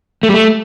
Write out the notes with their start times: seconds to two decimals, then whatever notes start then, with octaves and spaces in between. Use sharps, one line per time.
0.23 A3
0.29 G3
0.34 A3